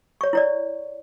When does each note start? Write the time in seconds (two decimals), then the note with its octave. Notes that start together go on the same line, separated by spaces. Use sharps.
0.21 C#5 C#6
0.33 E4 C#5 D5